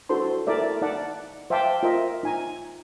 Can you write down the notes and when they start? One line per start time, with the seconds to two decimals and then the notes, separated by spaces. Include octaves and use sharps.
0.09 D4 E4 F#4 A4 C5 C6
0.47 E4 A4 A#4 D5 E5
0.82 D#4 D5 F#5 A5
1.50 C5 E5 F5 G5 A5 D6
1.83 F4 A#4 C5 D#5 E5
2.23 D#4 G#5 A#5